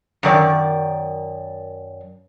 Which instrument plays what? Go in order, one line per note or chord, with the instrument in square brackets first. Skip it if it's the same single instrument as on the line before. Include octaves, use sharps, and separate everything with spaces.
[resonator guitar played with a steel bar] F#2 D#3 D5